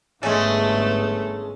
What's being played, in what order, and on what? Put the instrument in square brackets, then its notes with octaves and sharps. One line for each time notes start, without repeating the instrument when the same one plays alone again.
[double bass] G1 G#2 [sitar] G#3 C#4 [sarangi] A3 [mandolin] A4